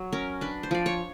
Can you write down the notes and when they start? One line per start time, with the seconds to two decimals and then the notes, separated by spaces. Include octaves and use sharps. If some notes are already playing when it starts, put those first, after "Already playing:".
Already playing: F#3
0.13 C#4 A#4
0.41 D4 B4
0.63 C5
0.71 F3 D5
0.86 C#5